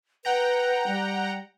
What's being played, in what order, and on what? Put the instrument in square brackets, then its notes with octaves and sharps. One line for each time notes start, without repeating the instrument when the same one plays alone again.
[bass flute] B4 [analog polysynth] F#5 G5 A#5
[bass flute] G3